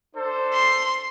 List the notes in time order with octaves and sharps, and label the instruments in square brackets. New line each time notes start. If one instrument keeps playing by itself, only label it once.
[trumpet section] D4 A4 C5
[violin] C6